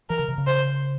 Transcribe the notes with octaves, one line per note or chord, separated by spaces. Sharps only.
E3 A#4
C#3
C3
C#3
C5